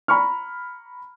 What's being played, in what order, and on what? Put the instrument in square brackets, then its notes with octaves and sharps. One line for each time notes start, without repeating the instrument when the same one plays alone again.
[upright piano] A#5 B5 C#6 F6